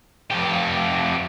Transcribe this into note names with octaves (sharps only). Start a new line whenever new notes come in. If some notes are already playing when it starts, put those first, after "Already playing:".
F2 G4